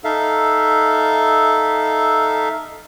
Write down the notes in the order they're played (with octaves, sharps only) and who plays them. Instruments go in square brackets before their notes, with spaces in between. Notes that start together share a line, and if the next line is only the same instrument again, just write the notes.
[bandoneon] D#4 A4 E5 F5